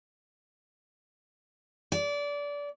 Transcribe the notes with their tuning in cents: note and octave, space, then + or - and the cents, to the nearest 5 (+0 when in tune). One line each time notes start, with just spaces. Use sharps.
D5 -25